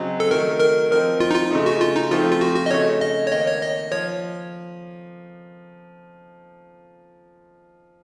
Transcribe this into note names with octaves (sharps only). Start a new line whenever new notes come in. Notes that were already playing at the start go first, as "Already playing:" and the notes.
Already playing: C#3 F#3 C4 D#4
A4
D#3 F#3 A3 D#4 A#4
A#4
F3 C4 D#4 A#4
F4
D#4
F4
C#3 A3 D#4
F#4
F4
D#4
F3 A3 C4 F4
F4
F#4
F#4
D#5
C#3 A3 D#4 C#5
D#5
C#5
D#3 A#3 D#4 D#5
C#5
D#5
F3 C#5